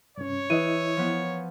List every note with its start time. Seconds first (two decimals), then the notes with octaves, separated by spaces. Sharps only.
0.18 G2 C3 C#4 C#5
0.50 E3 E4 B4 D#5 D#7
0.97 F3 B3